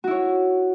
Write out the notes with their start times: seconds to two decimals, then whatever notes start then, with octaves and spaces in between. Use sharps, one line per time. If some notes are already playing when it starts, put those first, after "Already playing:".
0.04 F#4
0.07 E4
0.11 C#5